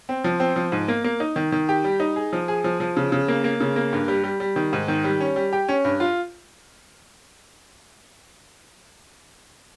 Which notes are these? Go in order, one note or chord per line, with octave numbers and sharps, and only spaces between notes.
C4
F3
C4
F3
G#2
A#3
A#3
D#4
D#3
D#3
G4
G3
D#4
G#4
F3
G#4
F3
F3
C#3
C#3
A#3
A#3
C#3
A#3
G2
G3
G3
G3
D#3
G#2
D#3
G3
C#4
G3
G4
C#4
G2
F4